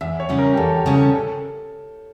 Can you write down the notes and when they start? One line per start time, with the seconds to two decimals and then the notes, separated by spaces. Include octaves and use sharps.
0.01 E2 E5
0.20 C#5
0.29 C#3 G3 C#4
0.38 A#4
0.54 G4
0.57 E2 A4
0.76 G4
0.86 C#3 G3 C#4
0.95 A4
1.15 A4